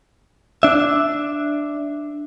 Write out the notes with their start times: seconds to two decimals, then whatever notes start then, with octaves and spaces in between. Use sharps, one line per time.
0.63 D4 E5